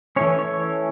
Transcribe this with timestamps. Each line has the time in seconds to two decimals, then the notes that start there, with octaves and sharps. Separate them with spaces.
0.16 E3 A3 C#4 C#5
0.39 C#5